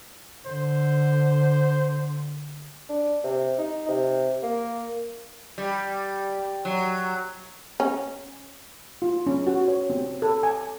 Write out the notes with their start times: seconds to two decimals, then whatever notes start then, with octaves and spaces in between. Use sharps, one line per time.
0.46 D3 C5
2.89 D4
3.24 C3
3.58 D#4
3.88 C3
4.43 A#3
5.58 G3
6.65 F#3
7.80 C#4
9.02 F4
9.27 C#4
9.47 F#4
9.68 C#5
9.90 C4
10.22 A4
10.43 G#5